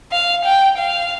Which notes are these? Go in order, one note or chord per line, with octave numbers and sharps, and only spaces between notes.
F5
G5
F5